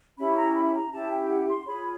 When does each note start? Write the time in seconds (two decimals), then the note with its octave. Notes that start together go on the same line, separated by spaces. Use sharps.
0.17 C#4 E4 G4 B5
0.36 A#5
0.55 B5
0.73 A#5
0.92 C#4 E4 G4 A5
1.10 G5
1.29 F#5
1.48 C6
1.66 F4 G#4 C#5 B5